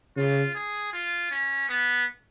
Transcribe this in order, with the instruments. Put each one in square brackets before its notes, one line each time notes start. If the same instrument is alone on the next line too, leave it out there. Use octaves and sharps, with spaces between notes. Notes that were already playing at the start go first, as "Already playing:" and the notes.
[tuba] C#3 [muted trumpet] F4
[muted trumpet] G#4
F4
C#4
B3